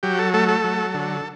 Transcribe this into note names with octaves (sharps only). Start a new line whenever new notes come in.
F#3 G4
A4
A3 A4
A4
F#3
D3